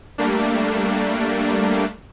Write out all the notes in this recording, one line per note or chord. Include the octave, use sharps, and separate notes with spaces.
G3 A3 A#3 D4